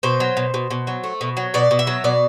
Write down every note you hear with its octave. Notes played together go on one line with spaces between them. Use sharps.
B2 C5
F#3
B2
B2
B2
F#3
A3
B2
F#3
B2 D5
B2
E5
F#3
B2 D5